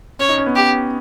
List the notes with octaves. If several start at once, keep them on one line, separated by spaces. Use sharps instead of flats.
C#4 C#5
D#4
C#4
B3
G4